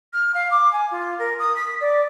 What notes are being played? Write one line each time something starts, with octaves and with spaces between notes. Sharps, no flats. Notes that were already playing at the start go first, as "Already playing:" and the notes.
F6
F5
D6
G#5
F4
A#4
D#6
B6
D5